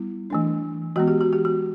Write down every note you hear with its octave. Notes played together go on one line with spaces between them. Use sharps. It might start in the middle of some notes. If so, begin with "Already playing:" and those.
Already playing: G3 B3 E4
E3 A3 D4
E3 G#3 B3 F#4
G4
F#4
G4
F#4